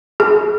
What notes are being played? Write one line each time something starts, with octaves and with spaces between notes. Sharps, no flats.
G#4